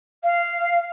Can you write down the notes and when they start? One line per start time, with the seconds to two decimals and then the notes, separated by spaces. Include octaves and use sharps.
0.23 F5